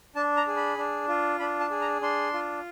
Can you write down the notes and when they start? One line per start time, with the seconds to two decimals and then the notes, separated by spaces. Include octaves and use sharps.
0.16 D4 A5
0.37 A#5
0.47 G#4
0.56 B5
0.78 D4
1.08 F4
1.40 D4 B5
1.60 A5
1.70 G#4
1.81 A#5
2.02 D4 C6
2.33 F4